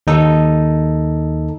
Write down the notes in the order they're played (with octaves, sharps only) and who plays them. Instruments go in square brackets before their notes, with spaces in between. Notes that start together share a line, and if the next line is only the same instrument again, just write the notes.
[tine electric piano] D#2 D#4 A4